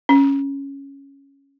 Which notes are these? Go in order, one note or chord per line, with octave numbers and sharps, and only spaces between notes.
C#4